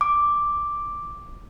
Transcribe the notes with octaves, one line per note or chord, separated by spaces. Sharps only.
D6